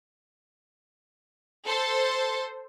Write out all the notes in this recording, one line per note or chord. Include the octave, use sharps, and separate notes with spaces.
A4 C5